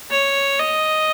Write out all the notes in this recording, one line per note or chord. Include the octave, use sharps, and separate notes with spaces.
C#5
D#5